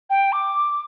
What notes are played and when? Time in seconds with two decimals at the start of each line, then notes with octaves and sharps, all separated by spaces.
0.10 G5
0.33 D6